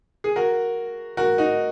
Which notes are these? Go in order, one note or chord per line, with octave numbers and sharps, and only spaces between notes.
G#4
F#4 A#4
F#4 A#4
D#4 F#4